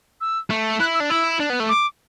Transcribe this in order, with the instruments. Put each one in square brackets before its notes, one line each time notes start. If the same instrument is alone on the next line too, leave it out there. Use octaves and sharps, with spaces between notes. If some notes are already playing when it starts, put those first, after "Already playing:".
[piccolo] E6
[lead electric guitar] A3
[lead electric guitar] E4 [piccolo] F#6
[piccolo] E6
[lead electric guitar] D4
[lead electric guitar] E4 [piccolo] E6
[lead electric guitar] D4
B3
A3
[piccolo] D6